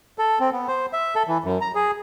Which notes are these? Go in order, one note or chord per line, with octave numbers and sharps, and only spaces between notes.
A4
C4
B3
C5
E5
A4
E3
F#2
A#5
G#4